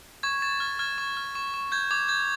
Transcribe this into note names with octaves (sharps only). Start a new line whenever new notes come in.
C#6 G#6
C#6 A6
F6 G#6
F6 G#6
C#6
F6
C#6
C#6
G6 G#6
D6 G#6
G6 G#6